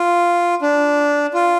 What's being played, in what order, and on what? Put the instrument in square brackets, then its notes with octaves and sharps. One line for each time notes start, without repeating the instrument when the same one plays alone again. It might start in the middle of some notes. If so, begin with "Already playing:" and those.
Already playing: [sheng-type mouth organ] F4
D4
F4